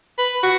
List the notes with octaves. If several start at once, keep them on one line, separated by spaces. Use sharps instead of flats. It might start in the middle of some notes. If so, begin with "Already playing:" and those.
B4
F#4